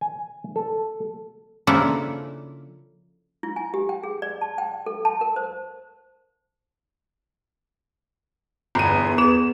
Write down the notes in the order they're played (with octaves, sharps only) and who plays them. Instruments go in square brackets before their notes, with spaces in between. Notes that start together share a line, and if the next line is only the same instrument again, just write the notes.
[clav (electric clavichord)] G#5
A4
[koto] C#3 F3 A#3 D4 E4 A4
[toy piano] E4
G#5
G4
G5
G#4
D5
A5
G5
A4
A5
A#4
C5
[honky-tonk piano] G1 D#7 [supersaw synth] E2 B3 G#6 [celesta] A#5 B5 C7
[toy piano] G#4 [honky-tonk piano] E7